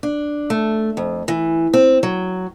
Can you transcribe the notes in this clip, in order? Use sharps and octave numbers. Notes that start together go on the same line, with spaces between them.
D4
A3
F2
E3
C4
F#3